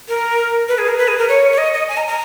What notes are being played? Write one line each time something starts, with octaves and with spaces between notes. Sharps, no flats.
A#4
B4
G#4
A#4
B4
G#4
A#4
C#5
C#5
D#5
D#5
G#5
A#5
A#5